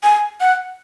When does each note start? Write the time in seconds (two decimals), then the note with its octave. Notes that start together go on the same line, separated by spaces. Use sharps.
0.03 G#5
0.41 F#5